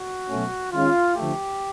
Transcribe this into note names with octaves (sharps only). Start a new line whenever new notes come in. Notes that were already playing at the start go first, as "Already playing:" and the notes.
Already playing: F#4
B2 F#3 A3 C#4
D#3 G#3 C#4 F4
D3 F3 A3 G4